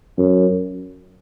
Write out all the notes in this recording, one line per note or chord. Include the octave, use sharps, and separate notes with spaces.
F#2